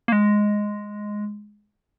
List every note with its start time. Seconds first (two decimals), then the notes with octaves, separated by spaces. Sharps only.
0.08 A#3
0.12 G#3